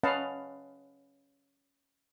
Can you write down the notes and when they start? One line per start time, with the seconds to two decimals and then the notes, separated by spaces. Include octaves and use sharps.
0.03 C#4 B4 D#5 F5 F#5 A5